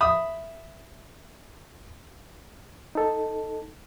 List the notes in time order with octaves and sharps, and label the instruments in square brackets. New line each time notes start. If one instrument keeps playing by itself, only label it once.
[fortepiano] E5 B5 D#6
[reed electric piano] D#4 A4